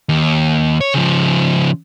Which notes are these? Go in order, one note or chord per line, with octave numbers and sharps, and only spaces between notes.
D#2
C#5
C#3 F3